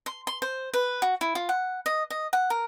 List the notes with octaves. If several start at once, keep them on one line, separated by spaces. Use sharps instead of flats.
C6
C6
C5
B4
F#4
E4
F4
F#5
D#5
D#5
F#5
A#4